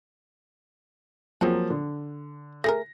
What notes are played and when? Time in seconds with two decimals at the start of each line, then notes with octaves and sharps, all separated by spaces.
1.41 F3 F#3 A#3 C4 F#4 G#4
1.70 D3
2.64 A3 G#4 A#4 A#6